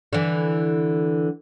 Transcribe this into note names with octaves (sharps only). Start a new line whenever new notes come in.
D3 E3